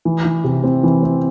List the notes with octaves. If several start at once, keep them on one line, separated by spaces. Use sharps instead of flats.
E3
E3
C3
C4
E3
C4